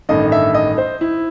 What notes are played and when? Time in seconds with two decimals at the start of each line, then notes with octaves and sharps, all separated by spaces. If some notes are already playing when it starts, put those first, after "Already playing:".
0.09 A1 G2 D#3 A3 D#5
0.32 E5
0.54 D#5
0.78 C5
1.01 E4